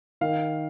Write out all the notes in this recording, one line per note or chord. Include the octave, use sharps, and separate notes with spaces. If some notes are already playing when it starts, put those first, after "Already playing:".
D#3 F5